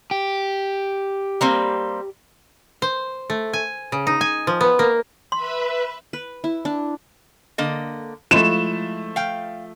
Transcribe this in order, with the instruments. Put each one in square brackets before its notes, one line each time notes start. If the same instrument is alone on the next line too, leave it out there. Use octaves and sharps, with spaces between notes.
[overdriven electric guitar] G4
[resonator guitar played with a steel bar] G3 A#3 C4
[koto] C5
A3
G#5
C#3
D#4
G#5
F3
B3
A#3
[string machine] B4 E5 B5 [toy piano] C6
[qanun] B4
E4
D4
[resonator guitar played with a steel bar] D3 A#3 D#5
[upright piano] F3 A3 [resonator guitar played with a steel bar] G#3 E4 [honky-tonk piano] E7
[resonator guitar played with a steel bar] F5 G5